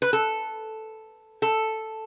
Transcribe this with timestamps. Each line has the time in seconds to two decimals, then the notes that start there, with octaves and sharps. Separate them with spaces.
0.02 B4
0.13 A4
1.42 A4